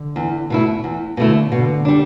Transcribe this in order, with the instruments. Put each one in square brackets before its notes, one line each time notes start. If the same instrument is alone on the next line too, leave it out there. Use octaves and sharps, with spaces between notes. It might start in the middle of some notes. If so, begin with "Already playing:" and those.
Already playing: [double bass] D3
[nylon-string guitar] E2
B2 A3 E4
E2
[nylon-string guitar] B2 A3 E4 [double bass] D3
[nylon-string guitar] B2 [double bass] D3
[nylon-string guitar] G3 D4